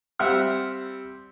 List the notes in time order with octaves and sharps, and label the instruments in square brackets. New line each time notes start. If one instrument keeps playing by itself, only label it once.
[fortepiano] G3 C4 E5 F#5 F6